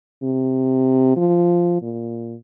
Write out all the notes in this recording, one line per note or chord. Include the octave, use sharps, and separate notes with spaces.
C3
F3
A#2